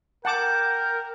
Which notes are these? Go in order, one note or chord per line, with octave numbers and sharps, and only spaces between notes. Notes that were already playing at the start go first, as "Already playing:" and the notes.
A#4 F#5 G5 A5 D6